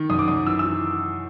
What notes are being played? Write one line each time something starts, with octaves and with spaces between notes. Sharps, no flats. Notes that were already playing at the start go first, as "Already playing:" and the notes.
Already playing: D#3
F#2 D#6
D6
F#2 D#6
E3 E6
E6
E3